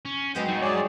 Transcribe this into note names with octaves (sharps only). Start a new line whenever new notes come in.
C#4
F#3 G#3 B3 C4 G6
F#2 D#4
G#4 C#5 D5